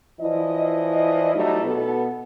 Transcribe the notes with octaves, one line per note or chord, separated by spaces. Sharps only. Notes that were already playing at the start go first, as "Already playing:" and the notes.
E3 F3 E4 D5 D#5
F#3 G3 A3 D#4 E4
B2 B3 A4